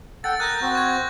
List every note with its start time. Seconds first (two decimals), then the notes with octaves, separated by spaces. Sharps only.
0.24 A4 F#5 G5 A6
0.40 A#4 D#6 F#6 G6 A#6
0.62 C4 F#4
0.75 C#6 G#6